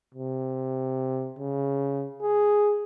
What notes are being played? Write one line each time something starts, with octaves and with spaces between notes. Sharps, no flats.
C3
C#3
G#4